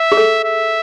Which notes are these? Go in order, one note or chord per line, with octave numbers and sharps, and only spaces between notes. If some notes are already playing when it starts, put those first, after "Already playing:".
Already playing: E5
G#4
A4
E5